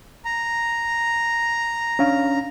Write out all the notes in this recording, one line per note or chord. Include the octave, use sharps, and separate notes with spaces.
A#5
C#4 D4 F5